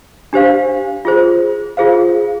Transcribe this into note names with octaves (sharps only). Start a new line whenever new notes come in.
D4 G4 C5 F5
F4 G#4 C5
F4 G#4 C5 F5